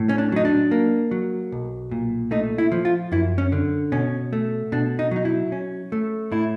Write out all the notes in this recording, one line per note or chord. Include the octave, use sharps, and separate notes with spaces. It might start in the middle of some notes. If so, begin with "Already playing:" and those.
Already playing: A2
C#4
D4
F#3 D#4
D4
A#3
F#3
B1
A#2
A3 D#4
E4
F3
F4
F#2 E4
C#4
D3
B2 C#4
A3
B2 D4
D#4
F#3 D#4
E4
C#4
A3
A2 E4